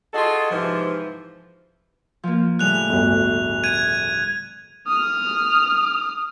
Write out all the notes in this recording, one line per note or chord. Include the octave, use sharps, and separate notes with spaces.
F4 F#4 G#4 A4 D#5
G#2 C3 E3 F3
F3 A#3
A2 C#3 G3 F#6 F7
G1 D2
G#6 D#7
D#6 F6